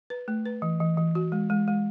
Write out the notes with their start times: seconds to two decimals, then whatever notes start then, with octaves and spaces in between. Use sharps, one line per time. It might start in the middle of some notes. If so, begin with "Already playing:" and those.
0.10 B4
0.28 A3
0.46 B4
0.62 E3
0.80 E3
0.97 E3
1.15 F#4
1.32 G#3
1.50 G#3
1.68 G#3